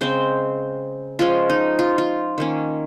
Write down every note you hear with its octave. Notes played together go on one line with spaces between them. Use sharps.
C#3 G#3 C4 C5
F3 G#3 C#4 F4
D#4
F4
F4
D#3 A#3 C#4